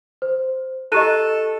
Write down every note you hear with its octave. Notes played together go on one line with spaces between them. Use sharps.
C5
E4 G4 A4 D#5 F#6 D#7